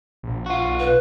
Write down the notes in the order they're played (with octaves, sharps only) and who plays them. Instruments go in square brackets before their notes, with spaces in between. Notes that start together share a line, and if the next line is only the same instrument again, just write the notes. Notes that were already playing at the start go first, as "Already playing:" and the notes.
[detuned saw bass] A#1
[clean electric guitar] F4 F#4
[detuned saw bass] B1
[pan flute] B4